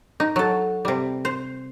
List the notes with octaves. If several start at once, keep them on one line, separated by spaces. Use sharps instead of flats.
D#4
F#3 A4
C3 G3
C5